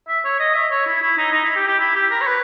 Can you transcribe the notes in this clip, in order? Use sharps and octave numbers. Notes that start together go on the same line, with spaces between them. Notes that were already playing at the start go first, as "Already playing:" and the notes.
E5
C#5
D#5
E5
C#5
E4
E4
D#4
D#4
E4
G4
G4
E4
G4
A#4
C#5
B4